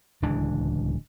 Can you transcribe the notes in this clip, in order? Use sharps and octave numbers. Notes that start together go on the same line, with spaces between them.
D1 C#2 E3 D4